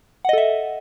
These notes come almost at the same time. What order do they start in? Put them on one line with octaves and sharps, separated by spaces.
F#5 D#5 A4 E5